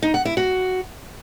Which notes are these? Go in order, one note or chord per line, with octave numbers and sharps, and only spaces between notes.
D#4
F#5
E4
F#4